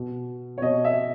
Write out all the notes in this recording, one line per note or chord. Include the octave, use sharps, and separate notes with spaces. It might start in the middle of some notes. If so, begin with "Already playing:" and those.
Already playing: B2
C#5
B2 D#5
E5